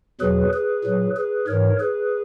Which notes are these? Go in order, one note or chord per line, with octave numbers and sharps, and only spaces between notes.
E2 B2 F#3 G#4 B4
G#4 B4
A#2 F#3
G#4 B4
G#2 E3 A#4 C#5
G#4 B4